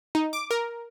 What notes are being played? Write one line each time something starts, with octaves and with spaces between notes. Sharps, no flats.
D#4
D6
A#4